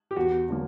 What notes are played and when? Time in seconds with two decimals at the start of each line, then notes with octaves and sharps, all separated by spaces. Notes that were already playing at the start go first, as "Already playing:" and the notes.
0.11 G4
0.16 E2 F#4
0.49 D3 F#3 A#3